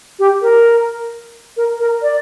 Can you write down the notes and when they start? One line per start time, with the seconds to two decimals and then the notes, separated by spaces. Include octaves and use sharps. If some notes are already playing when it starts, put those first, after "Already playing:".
0.19 G4
0.42 A#4
1.57 A#4
1.80 A#4
2.02 D5